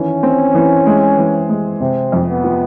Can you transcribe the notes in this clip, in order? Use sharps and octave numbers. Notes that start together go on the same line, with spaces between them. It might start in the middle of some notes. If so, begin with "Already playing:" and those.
Already playing: D#3 E3 C#4
C4
E3
G#3
E3
G#3
C3 C4
F2
B3
F3